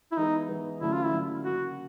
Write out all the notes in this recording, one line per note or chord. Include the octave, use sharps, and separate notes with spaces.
E4
E3 G#3 B3 D#4
E3 G#3 B3
D3 F#3 A3 C#4 E4
F4
E4
D3 F#3 A3 C#4
C#3 F#3 A#3 D4 F#4